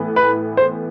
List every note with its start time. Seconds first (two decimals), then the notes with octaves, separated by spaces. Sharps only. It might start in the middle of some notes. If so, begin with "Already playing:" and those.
Already playing: A2 E3 B3
0.16 B4
0.57 C5